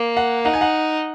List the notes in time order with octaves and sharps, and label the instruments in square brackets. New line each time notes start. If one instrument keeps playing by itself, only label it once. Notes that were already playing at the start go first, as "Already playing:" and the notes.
Already playing: [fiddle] A#3
[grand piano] F#5
[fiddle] D#4 [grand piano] F#5
[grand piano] G#5
F#5